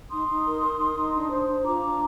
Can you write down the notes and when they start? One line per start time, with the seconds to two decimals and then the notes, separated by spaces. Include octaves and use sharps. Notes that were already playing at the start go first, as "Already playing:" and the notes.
0.10 D#4 C6 D#6
0.28 D#4
0.45 A#4
0.61 A#4
0.79 D#4
0.97 D#4
1.13 D4
1.30 C5
1.48 D4
1.64 F4 A#5 D6
1.82 D4